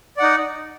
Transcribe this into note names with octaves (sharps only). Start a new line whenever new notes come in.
D#4 D5 F#5